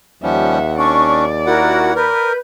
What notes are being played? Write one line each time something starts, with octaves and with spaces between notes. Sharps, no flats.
D#2 F3 G3 C#4 E5 F#5
C#4 D4 D5 C#6
E4 F#4 A#4 F#5
A#4 B4 G6